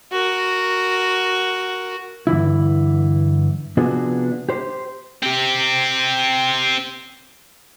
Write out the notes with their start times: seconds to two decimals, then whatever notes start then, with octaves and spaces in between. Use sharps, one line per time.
0.12 F#4 A#4
2.27 G2 D3 E3 E4
3.77 C3 F3 B3 D4 F#4 G#4
4.49 G4 C5
5.23 C4 G4